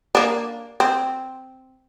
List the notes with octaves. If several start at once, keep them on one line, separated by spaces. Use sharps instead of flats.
A#3 D4
C4